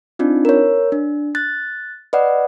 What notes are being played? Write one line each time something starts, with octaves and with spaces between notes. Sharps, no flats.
C4 D4 D#4 F4
A#4 C#5
D4
F#6 A6
B4 D5 D#5 F#5